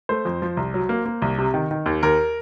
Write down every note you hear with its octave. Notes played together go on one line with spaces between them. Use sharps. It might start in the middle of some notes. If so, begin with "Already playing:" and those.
A3 C5
F2
F3
C2
F#3
A#3
A#3
C2
C3
D#3
D#3
D#2
D#2 A#4